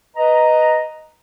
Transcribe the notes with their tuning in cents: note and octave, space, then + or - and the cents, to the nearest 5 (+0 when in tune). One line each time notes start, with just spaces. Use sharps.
B4 +0 D#5 +0 A#5 +0